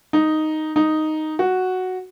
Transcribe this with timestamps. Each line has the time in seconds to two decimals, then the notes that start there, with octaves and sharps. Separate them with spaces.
0.13 D#4
0.76 D#4
1.39 F#4